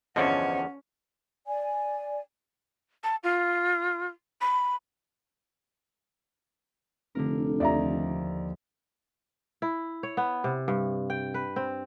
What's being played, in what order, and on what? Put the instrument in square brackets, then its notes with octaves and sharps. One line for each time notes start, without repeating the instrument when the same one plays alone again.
[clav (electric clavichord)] E2 D3 F3 [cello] C#4 [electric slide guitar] C5 C#5 D#5 [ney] F#5
[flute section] D5 G#5
[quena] A5
F4
B5
[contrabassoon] F1 [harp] D3 A#4
[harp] D#2 F3 [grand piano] D5 E5 A#5
[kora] E4
C#5
B3
C3
G2
G5
B4
C4